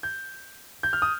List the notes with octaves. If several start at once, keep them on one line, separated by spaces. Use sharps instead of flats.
G6
G6
F6
D#6